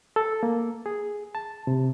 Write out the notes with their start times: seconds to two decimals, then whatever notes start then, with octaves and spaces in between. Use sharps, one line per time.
0.16 A4
0.43 A#3
0.86 G#4
1.35 A5
1.67 C3